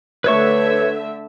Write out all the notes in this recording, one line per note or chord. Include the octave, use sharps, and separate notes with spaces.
D3 A3 B4 C#5 E5 C#6